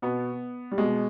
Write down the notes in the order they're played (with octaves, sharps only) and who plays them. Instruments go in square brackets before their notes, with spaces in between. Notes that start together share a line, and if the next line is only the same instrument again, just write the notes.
[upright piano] B2 B3
G3
B2 G#3